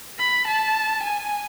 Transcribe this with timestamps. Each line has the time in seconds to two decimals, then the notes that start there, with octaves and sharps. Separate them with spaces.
0.19 B5
0.48 A5
1.03 G#5